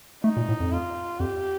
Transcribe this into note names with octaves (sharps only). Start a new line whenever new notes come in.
A3 D#4
A#2
A2
F2
F4
F2 G4